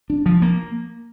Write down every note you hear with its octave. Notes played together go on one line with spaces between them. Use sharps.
D4
F3
A#3